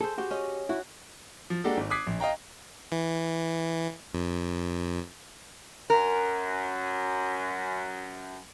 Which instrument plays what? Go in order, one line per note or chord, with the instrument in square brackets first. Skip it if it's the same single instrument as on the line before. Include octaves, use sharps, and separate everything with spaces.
[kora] G#4 C5 [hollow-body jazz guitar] A4
[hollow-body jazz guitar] F#4 G4
[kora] C#4 D#5
[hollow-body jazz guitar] E4 [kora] F#4
[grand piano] F3
G#3 A#3 D4 F#4 G4 A4
G#1
D6 D#6 F#6 G#6 B6 C7
A#1
D#5 F5 G5 A#5
[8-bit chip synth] E3
F2
[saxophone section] F#2 [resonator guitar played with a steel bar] A#4